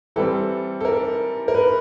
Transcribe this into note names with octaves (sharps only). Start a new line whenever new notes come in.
E3 G3 C4 A4
A4
A#4
A#4
B4